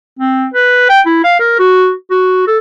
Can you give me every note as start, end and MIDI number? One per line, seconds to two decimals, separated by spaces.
0.19 0.46 60
0.54 0.88 71
0.89 1.01 79
1.06 1.22 64
1.24 1.37 77
1.40 1.58 70
1.59 1.93 66
2.10 2.45 66
2.47 2.58 69